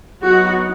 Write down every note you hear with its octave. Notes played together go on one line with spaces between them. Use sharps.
F#3 B3 D#4 F#4